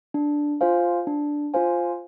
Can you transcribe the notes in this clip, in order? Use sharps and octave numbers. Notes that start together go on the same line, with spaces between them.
D4
F4 C5 F5 G#5
D4
F4 C5 F5 G#5